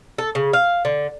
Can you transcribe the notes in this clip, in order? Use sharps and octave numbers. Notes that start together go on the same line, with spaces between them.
A4
C#3
F5
D3